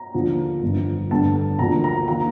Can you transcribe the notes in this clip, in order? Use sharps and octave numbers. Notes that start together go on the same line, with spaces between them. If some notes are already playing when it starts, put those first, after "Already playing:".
Already playing: A#5
D#2 D3 F3
G1 F2 D3
G2 D3 A3 A5
D2 D3 F3 A#3 D4 A#5
A#5
D#3 A#3 F4 A#5